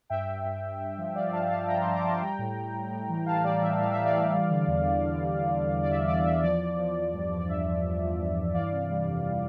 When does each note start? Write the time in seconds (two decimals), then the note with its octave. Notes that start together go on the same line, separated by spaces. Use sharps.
0.10 G2 E5 G5
0.27 G2
0.45 G2
0.63 G2
0.80 G2
0.98 F3
1.15 G2 D5 F5
1.33 F3 F5 A5
1.50 F3 F5 A5
1.67 F3 G5 A#5
1.81 G2 A5 C6
1.94 A#5 D6
2.03 F3 A5 C6
2.21 G3 G5 A#5
2.39 A2
2.56 A2
2.73 A2
2.91 A2
3.09 E3
3.26 E3 F5 A5
3.44 G3 D5
3.61 E3 E5
3.79 A2 F5
3.92 E5
3.97 A2
4.05 D5 F5
4.15 E3
4.32 G3
4.50 D3
4.67 E2
4.84 E2
5.03 D3
5.20 G3
5.37 D3
5.55 D3
5.73 E2
5.83 D5
5.90 E2 E5
6.08 E2 D5
6.25 E2 E5
6.43 F3 D5
6.61 F3
6.79 F3
6.96 F3
7.13 G2
7.31 F3
7.38 D5
7.49 G2 E5
7.67 F3
7.84 G2
8.02 F3
8.19 G2
8.37 G2
8.54 E3 D5 F5
8.72 C3
8.90 G3
9.08 F2
9.25 G3